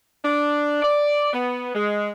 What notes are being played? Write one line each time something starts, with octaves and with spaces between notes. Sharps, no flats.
D4
D5
B3
G#3